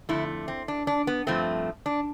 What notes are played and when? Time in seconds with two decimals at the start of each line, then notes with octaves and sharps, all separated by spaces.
0.09 F2 D3 A3 E4
0.48 C4
0.68 D4
0.87 D4
1.07 B3
1.27 G2 F3 A3 C4
1.86 D4